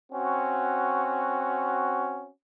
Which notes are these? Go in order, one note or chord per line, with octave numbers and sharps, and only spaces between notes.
C4 C#4 F#4